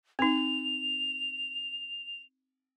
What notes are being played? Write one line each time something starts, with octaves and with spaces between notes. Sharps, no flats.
C4 D#4 F7